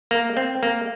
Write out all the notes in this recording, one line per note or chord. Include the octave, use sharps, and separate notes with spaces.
A#3
C4
A#3